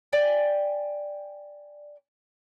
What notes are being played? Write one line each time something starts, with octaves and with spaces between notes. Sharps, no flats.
D5 G5 G#5